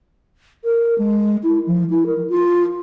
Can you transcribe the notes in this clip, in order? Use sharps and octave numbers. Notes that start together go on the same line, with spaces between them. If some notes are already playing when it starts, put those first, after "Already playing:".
A#4
G#3
E4
F3
E4
A#4
F4